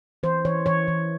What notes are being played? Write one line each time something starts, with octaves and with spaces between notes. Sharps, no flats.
E3 C5
E3 C#5
E3 C#5
E3